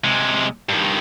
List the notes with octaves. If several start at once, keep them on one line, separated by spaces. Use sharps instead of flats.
C3 G#3
G2 D#3